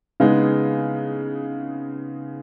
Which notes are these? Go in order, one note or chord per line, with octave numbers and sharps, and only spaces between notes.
C#3 G#3 B3 D#4